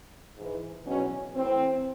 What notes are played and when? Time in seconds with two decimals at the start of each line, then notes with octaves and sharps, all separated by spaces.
0.36 G#2 E3
0.86 E2 B2 F#3 C#4
1.36 A2 E3 C4